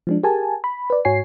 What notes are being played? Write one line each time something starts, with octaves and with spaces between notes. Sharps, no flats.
F3 G#3 D4
G4 G#4 A#4 G#5 A5
B5
B4 D5
G#2 F#4 C#5 G#5 C7